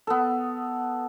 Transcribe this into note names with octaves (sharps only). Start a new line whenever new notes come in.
B3 A4